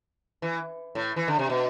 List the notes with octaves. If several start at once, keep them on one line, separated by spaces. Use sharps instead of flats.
E3
A2
E3
D3
C3
B2